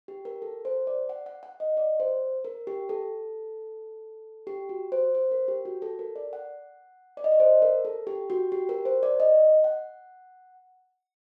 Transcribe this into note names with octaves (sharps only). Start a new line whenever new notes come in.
G4
A#4
A4
C5
D5
F#5
F#5
F#5
D#5
D5
C5
A#4
G4
A4
G4
F#4
C5
C5
A#4
G4
F#4
A4
A#4
D5
F#5
D5
D#5
D5
C5
A#4
A4
G4
F#4
G4
A#4
C5
D5
D#5
F#5